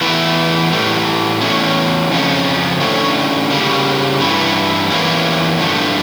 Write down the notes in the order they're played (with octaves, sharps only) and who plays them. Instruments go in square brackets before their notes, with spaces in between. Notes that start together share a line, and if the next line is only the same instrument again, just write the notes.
[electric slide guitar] E2 E3 A3 E4
A2 E3 G3
E2 D3 A3 C#4 E4
F2 C#3 F3 C#4
D3 A3 C#4 E4
C#3 G3 A#3
G2 E3 A3 E4
E2 E3 A#3 C#4 E4
G2 D3 F3 A3